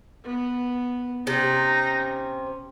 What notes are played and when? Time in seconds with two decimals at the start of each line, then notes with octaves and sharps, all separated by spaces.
0.24 B3
1.27 C3 C#4 D#4